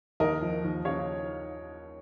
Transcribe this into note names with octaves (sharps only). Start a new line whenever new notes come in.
D#2 A#4 D#5
F3
D#2
C#3 C#5 F5